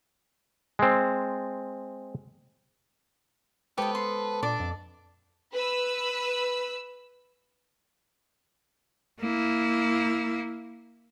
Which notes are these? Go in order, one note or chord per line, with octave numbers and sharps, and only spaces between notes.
G#3 C4
G#3 B3 G4 A4 B4 C5
C6
A#2 D4 D5
F2
B4 E6
A#3 E4